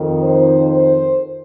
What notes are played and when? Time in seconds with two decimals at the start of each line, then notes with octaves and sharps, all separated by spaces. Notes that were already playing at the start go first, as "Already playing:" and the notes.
Already playing: F2 D#3
0.22 C5
0.70 C5